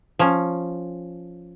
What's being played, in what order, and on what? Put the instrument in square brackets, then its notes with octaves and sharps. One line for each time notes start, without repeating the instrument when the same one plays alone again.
[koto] F3 C#4